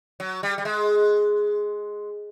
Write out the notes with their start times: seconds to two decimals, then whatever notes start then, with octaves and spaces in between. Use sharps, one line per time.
0.20 F#3
0.43 G3
0.58 G3
0.65 G#3